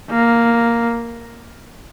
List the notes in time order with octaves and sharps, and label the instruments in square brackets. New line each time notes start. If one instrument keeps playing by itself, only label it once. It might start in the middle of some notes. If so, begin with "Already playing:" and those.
[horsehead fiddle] A#3